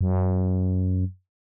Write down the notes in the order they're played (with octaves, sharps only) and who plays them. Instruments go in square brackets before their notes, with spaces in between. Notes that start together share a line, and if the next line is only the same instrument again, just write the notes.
[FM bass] F#2